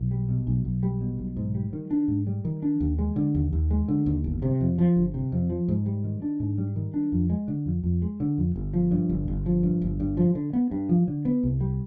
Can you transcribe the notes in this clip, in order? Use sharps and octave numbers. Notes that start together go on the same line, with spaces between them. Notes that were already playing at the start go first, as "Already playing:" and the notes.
Already playing: B1
G3
B2
B1
B1
G3
B2
B1
G#2
G3
D#3
D4
G#2
G3
D#3
D4
D#2
G#3
D3
D#2
D#2
G#3
D3
D#2
G1
C3
F2
F3
G1
C3
F2
F3
G#2
G3
D#3
D4
G#2
G3
D#3
D4
F2
G#3
D3
F2
F2
G#3
D3
F2
G1
F3
G2
G1
G1
F3
G2
G1
G2
F3
D3
B3
G2
F3
D3
B3
C2
G3